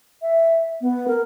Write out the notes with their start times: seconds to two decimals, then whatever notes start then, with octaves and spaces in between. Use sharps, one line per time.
0.22 E5
0.81 B3
1.08 A#4